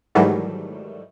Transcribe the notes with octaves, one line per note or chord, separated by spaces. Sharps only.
G#2 D#3 E3 F#3 G3 A3